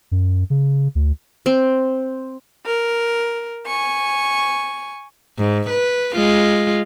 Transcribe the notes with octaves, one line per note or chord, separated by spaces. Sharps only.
F#2
C#3
D2
C4
A#4
G#5 C#6
G#2
B4
G#3 F4